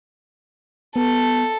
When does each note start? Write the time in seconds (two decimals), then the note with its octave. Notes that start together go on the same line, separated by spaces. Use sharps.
0.96 B3 A4